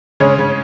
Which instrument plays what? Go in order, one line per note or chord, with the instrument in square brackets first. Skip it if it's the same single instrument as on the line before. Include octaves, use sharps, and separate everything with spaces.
[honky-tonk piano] C#3 [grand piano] G#3 C#4 G#4 C#5
[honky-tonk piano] C#3